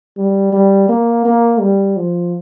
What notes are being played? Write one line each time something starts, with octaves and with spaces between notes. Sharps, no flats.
G3
G3
A#3
A#3
G3
F3